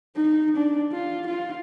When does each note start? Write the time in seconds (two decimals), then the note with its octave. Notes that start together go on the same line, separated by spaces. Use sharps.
0.16 D#4
0.56 D4
0.92 F4
1.27 F4